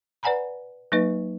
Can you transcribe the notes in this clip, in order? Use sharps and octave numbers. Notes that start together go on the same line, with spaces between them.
B4 D5 F#5 G#5 A#5 B5
F#3 A#3 D#4 B4 D#5